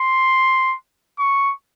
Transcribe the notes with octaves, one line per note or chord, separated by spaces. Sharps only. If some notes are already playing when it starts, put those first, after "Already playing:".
Already playing: C6
C#6